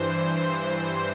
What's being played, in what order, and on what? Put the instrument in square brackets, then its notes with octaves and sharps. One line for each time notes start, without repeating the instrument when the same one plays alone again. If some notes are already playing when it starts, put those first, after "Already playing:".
Already playing: [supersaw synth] G2 E3 C5